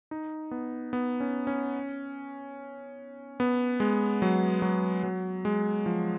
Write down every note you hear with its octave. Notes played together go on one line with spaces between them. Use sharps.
D#4
B3
B3
C#4
C#4
B3
G#3
F#3
F#3
F#3
G#3
F3